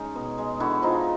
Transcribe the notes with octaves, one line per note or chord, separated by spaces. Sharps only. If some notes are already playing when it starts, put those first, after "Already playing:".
Already playing: G#3 C#4 D#4
B2
G#3
D3 E4 F#4
F3 D#4 F4